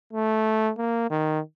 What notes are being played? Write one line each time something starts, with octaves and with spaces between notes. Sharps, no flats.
A3
A#3
D#3